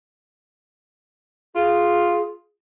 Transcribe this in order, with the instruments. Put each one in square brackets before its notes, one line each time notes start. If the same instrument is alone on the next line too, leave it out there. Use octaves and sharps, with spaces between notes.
[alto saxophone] F4 [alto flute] G#4